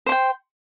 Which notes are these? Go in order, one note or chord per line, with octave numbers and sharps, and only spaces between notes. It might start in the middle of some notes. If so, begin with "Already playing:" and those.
C5 G5 C6